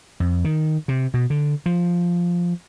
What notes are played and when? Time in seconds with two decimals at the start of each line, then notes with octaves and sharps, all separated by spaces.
0.20 F2
0.45 D#3
0.88 C3
1.14 B2
1.30 D3
1.66 F3